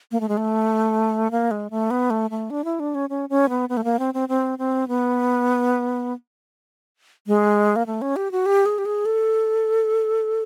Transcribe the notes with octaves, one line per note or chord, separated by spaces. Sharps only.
A#3
A3
G#3
A3
A#3
G#3
A3
B3
A3
A3
D4
E4
D4
C#4
C#4
C#4
B3
B3
A3
A#3
C4
C4
C4
C4
B3
G#3
A#3
A3
C#4
G4
F#4
G4
G#4
G4
G#4
A4